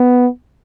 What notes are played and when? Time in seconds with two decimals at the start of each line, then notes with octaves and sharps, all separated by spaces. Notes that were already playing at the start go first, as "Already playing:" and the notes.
Already playing: B3